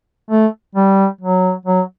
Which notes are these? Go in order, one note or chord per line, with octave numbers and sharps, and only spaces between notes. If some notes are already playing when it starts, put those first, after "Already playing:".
A3
G3
F#3
F#3